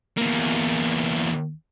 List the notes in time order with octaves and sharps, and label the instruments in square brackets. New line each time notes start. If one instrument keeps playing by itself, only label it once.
[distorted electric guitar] E2 A#3